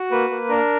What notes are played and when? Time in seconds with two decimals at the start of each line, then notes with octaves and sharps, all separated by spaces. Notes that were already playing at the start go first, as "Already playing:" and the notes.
Already playing: F#4
0.11 A#3 B4
0.30 A#3
0.49 D4 A#4